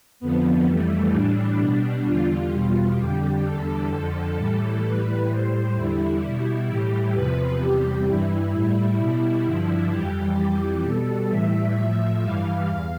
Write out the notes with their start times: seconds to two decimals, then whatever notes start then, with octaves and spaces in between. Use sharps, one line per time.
0.20 F2 D3 F3 B3
0.66 F2 E3 G3 A3
1.12 A2 E3 G3 D4
1.59 B2 G3
2.05 E2 D3 G3 F4
2.51 E2 B2 G3 F4
2.97 F2 D3 G3 G4
3.44 E2 D3 G3 A4
3.90 F2 D3 F3
4.36 A2 E3 G3
4.83 A2 E3 G3 B4
5.29 A2 G3 C5
5.74 E2 D3 G3 E4
6.21 B2 G3
6.67 A2 E3 G3 G4
7.13 E2 C3 F3 B4
7.60 E2 C3 G3 G4
8.06 G2 E3 G3 E4
8.53 A2 G3
8.98 B2 G3
9.45 G2 D3 F3
9.91 F2 E3 G3 G4
10.37 F2 E3 G3
10.83 B2 G3 A4
11.29 A2 E3 G3 E5
11.76 A2 F3
12.22 G2 E3 G3 F5
12.68 E2